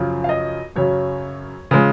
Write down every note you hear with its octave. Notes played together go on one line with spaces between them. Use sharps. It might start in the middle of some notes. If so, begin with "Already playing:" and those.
Already playing: F#2 C#3 F3
F5
D#5
F#2 C#3 F#3 C#5
C#3 F3 G#3